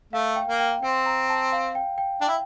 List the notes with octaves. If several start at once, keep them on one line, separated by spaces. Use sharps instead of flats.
A3 F5
G5
A#3
G5
C4 G5
A#5
A5
F5
G5
G5
D4 G5
E4